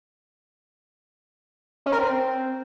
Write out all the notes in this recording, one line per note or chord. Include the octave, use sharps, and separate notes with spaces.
C#4
A#4
C4